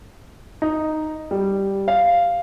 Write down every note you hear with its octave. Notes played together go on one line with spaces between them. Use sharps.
D#4
G3
F5